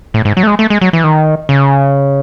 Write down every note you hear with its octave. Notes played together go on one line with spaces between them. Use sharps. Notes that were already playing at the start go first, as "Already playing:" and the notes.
A2
G#2
F#3
A3
G#3
A3
G#3
F#3
E3
D#3
C#3